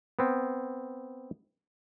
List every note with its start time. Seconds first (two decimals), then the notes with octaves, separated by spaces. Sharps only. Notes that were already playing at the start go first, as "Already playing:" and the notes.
0.19 B3 C4